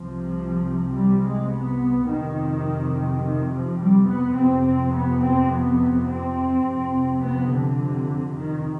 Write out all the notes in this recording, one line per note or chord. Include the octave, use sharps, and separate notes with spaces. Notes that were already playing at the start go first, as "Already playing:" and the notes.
Already playing: C2 C3 F3
G3
G#3
B3
F2 C3 D#3
D#3
F3
G3
B3
F2 C3 C4
B3
C4
B3
C4
F2 C3
B3
D3
D#3